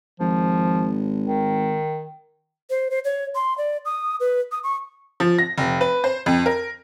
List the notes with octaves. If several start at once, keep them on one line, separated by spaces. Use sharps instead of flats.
G#1 F3
D#3
C5
C5
C#5
C6
D5
D#6
B4
D#6
C#6
F3
A#6
F1
B4
C5
F2
A#4